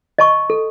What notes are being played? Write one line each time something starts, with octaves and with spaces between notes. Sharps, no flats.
D#5 A5 C#6
A4